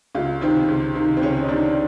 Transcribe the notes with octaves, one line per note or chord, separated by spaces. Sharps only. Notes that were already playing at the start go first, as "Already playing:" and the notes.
C#2 F4
C3 D#3 C4
C#2
C3 D#3
C4
C#2 C#4
D#4
C3 D#3 D4